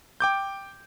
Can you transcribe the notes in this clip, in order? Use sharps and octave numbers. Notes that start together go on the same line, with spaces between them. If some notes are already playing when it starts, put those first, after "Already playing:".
G5 D6 G6